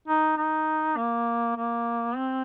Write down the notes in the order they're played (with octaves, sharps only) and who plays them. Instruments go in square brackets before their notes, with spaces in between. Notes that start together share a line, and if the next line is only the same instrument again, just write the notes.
[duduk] D#4
D#4
A#3
A#3
C4